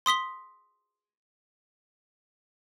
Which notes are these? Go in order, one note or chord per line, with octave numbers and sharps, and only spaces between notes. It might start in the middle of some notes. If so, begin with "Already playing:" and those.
C6 D#6 B6 G7